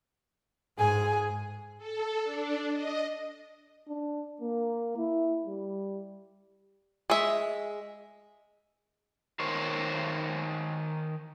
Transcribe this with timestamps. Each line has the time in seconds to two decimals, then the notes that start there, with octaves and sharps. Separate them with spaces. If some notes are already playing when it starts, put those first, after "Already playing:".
0.78 G#2 G#4 G#5
1.78 A4
2.23 D4
2.73 D#5
3.88 D4
4.41 A#3
4.97 E4
5.45 G3
7.10 G#3 E5
9.40 D#3 A#4 C5 C#5